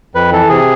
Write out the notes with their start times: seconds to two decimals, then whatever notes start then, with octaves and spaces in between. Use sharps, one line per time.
0.15 F2 B4
0.32 E3 A4
0.49 C3 G#4